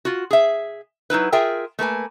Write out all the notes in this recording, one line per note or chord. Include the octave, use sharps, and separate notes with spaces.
F4 F#4
G#4 E5
F#3 D#4 E4 B4
F4 G#4 A#4 E5 G5
A3 A#3 B4 G#5